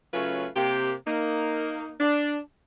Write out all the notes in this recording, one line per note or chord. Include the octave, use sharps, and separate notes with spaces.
C#3 F#3 A3 C#4 F4 B4
C3 A#3 G4
A#3 D#4
D4